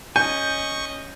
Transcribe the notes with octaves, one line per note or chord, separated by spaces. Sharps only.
C#4 D#5 G#5 C#6 G6